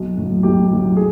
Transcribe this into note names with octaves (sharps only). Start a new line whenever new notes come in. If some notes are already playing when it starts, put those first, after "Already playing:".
Already playing: B1
A2 F#3
B1 G4
A2 F#3
G#4